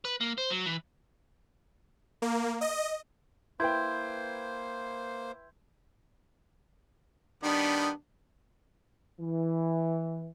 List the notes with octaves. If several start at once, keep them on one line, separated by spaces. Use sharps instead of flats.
B4
A#3
C5
F#3
E3
A#3
D#5
A#3 E4 B4 C5 G5 C6 G6 G#6
D#3 G3 B3 D4
E3